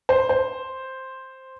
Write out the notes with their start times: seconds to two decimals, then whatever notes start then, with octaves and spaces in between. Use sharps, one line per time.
0.09 C5
0.29 C5